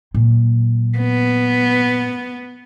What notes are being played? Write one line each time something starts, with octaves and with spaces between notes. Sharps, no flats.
A#2 F#3
B3